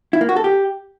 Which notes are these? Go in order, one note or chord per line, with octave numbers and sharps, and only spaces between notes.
E4
A#3
F#4
A4
G4